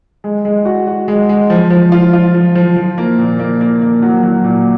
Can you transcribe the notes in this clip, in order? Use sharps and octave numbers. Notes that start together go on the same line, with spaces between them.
G#3
G#3
F#4
F#4
G#3
G#3
F3
F3
F4
F4
F3
F3
F3
A#3
A#2
A#3
A#3
A#3
F#3
F#3
A#2